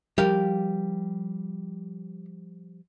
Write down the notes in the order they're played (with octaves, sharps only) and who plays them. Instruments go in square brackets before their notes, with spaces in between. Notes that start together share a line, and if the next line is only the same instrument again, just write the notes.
[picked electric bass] F3 G3 [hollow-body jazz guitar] G4 A#4 F5